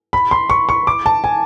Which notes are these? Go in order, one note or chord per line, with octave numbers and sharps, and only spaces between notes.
B5
C6
C#6
C#6
D6
A5
G#5